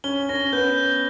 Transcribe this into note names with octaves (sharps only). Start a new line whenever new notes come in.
C#4 G7
C#4 A#6
B3 G6
G6